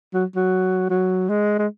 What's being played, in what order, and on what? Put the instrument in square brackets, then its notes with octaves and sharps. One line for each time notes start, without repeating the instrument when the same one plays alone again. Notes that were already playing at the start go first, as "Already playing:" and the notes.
[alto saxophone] F#3
F#3
F#3
G#3
G#3